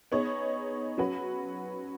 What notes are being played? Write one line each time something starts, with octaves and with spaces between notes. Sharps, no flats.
B3 D#4 G#4 C#5
F#3 C#4 F#4 B4